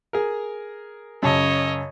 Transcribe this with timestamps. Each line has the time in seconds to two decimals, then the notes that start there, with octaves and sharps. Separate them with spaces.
0.13 G#4 A#4
1.23 F#2 C#3 C#5 D#5 A5